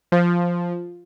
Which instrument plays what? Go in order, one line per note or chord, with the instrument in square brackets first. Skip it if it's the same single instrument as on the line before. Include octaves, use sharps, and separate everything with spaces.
[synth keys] F3